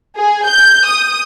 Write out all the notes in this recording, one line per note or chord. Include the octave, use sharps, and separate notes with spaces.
G#4
G6
D#6